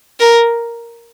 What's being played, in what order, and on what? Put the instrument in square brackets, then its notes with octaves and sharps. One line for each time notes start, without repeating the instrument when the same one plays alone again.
[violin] A#4